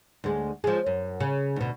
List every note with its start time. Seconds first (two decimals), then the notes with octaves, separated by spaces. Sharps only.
0.24 D2 G#3
0.64 F3 G#3
0.86 F#2
1.20 C#3
1.56 D2 B2